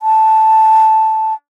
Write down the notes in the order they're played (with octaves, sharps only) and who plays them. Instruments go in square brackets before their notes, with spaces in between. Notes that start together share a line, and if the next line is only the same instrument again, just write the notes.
[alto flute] A5